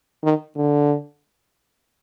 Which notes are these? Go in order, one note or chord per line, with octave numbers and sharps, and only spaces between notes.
D#3
D3